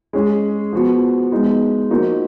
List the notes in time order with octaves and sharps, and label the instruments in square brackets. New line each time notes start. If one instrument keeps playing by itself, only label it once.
[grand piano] G#3 C#4 G#4
F3 B3 F#4
G#3 B3 D#4
F3 A#3 D#4 F#4